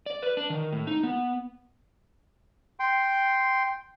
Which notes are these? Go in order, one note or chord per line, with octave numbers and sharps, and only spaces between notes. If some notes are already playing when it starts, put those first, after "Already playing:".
D5
B4
D4
D#3
A2
D#4
B3
G5 C6